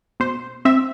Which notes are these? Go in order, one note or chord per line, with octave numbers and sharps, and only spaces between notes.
B2 C5
C4 E5